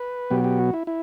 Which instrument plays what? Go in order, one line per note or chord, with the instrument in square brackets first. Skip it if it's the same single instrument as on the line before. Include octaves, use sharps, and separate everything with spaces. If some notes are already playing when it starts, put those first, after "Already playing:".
Already playing: [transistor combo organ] B4
B2 F#3 B3 G4
G4
F#4
E4
E4